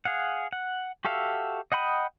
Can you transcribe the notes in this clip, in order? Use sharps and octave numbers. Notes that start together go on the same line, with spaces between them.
G#4 F5 F#5
F#5
F#4 G4 A4 E5 F5
D#5 F#5 G5 B5 D#6